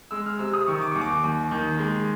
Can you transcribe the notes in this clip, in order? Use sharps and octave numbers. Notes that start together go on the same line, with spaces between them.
G#3 E6
F6
C3 E6
D#6
D#3 C#6
D6
D#2 C#6
D6
D#2
D#3
G#3